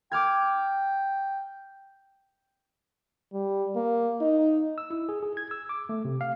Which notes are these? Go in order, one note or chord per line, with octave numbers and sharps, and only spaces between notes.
G5 D6 F6 G#6
G3
A#3
D#4
E6
E4
G#4
G#4
G#6
E6
D6
A3
C3
F5